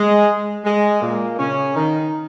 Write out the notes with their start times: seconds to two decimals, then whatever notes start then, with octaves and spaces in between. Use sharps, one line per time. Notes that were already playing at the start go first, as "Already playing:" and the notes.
Already playing: G#3
0.65 G#3
1.01 A#2 A#3
1.38 C#3 C#4
1.75 D#3 D#4